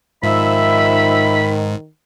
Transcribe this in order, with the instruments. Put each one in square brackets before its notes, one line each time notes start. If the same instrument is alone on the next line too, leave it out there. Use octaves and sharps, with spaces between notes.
[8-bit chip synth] G#2 [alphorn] D#3 [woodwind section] F3 E5 [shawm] B5